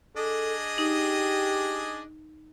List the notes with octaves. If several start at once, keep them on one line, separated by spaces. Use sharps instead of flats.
D4 G#4 A4 D#5
D#4 G4